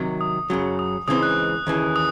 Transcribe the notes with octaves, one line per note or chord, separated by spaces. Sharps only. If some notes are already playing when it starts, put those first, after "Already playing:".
Already playing: C3 D#3 F#3
D#6
F#2 C#3 F#3
D#6
C#2 C#3 E3 C4 D#4 D#6
F#6
D#2 C#3 E3
D#6